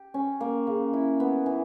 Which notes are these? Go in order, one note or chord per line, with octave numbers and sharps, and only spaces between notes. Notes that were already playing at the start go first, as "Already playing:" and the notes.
Already playing: G4
C#4
A#3
C#3
E4
B3
E3